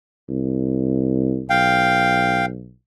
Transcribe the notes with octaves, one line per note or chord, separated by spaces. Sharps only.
C2
B1 F5 G5